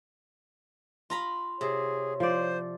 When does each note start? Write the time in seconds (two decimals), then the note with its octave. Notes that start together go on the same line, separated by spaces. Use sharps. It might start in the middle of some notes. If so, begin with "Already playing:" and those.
1.10 F4 A#5 B5
1.61 C3 G#4 C#5
2.20 F3 C5 D5